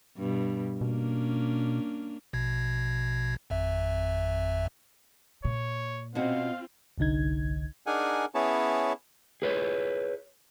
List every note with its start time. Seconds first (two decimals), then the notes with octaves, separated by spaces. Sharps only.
0.17 G2 B2
0.81 B2 A#3 C#4 D4
2.33 A#1 B2 G#6
3.50 G#1 F2 E5
5.45 A#2 C#5
6.15 B2 C4 C#4 F4 F#4 F5
6.98 G1 C2 D3 D#4 G#6
7.87 D4 D#4 G#4 A#4 F#5 G#5
8.35 B3 C#4 E4 G#4 C#5 A5
9.42 G#4 B4 C#5